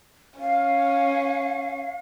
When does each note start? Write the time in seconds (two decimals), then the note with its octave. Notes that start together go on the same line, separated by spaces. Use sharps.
0.40 C#4 F5